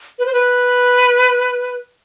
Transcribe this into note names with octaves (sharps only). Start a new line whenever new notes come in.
B4
C5
B4